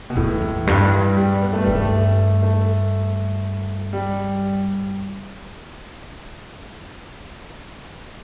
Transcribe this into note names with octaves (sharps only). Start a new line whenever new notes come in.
B2
E2 A2
E2
G2
G3
B3
A3
G2 G3
A3
A3
G3